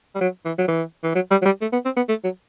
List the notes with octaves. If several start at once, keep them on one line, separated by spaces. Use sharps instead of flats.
G3
F#3
E3
F#3
E3
E3
F#3
G3
F#3
G3
A3
B3
C4
B3
A3
F#3